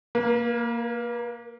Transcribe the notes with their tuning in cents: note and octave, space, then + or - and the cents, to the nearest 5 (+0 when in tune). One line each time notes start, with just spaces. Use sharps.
A#3 +0 B4 -45